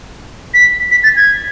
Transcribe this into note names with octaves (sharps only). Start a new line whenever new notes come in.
B6
B6
A6
G#6